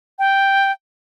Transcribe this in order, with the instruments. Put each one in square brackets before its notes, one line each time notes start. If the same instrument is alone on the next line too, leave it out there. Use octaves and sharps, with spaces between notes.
[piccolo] G5